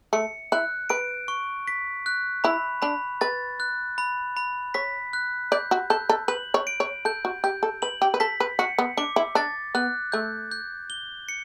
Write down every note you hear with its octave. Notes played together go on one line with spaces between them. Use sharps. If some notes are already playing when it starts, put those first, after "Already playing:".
A3 C#7
E4 F#6
B4 D7
C#6
B6
F#6
E4 B5
D4 B5
B4 A6
F#6
B5
B5
C#5 B6
F#6
D5 G6
F#4
A4 G6
A4
B4 F#7
C#5
D7
C#5
A4 G6
F#4
G4 G6
A4
B4 F#7
G4
B4
A4 B6
B4
F#4 C#7
B3
D4 D6
E4
D4 A6
B3 F#6
A3 G6
G6
G7
C#7